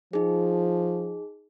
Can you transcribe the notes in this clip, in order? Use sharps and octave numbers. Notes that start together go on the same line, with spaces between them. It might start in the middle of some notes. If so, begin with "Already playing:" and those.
F3 D#4 G#4